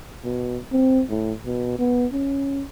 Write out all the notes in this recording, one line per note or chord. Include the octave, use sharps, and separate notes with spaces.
B2
C4
A2
B2
B3
C#4